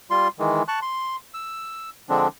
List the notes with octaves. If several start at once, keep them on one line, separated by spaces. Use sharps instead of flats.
G3 F4 C6
D#3 E3 G#3
A5 C#6 F#6
C6
E6
D3 F3 G#3 C4 D4